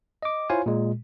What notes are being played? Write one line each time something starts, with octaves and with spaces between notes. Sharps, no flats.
D#5 D6
E4 F4 C5 C#5 F5 G#5
A#2 G#3